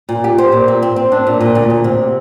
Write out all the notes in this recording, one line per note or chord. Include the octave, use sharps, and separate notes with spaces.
A#2
G4
C5
A#2
C4
C4
C4
D4
A#2
A#2
D2
D2
C3